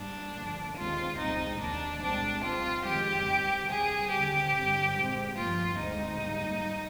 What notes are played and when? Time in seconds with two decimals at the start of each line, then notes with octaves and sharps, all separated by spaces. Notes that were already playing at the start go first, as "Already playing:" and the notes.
Already playing: G#2 G3 A#3 D4
0.35 G2 D3 F3 A#3
0.77 D#2 D3 G#3 C4 F4
1.18 C2 A#2 G#3 C4 D#4
1.60 D#2 D#3 A#3 D4
2.02 C2 A#2 G#3 C4 D4
2.44 C2 A#2 G#3 C4 F4
2.85 F2 D#3 G#3 C4 G4
3.28 G#2 D#3 G3 C4
3.70 D2 C3 G3 C4 G#4
4.11 D#2 D3 G3 C4 G4
4.54 G2 D3 G3 C4
4.95 A#2 G#3 C4
5.37 G2 F3 A#3 F4
5.78 D2 D3 G#3 C4 D#4
6.20 G#2 G3 A#3